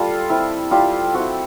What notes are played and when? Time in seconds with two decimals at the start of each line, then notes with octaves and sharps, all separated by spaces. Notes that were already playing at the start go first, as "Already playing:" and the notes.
Already playing: G3 F4 A4
0.30 C4 E4
0.71 G3 F4 G4
1.14 C4 E4 F#4